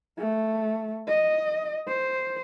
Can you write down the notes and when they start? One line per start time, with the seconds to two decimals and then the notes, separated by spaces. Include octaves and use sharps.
0.19 A3
1.08 D#5
1.88 C5